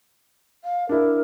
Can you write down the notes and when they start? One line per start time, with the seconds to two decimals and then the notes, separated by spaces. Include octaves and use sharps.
0.64 F5
0.89 D4 E4 A#4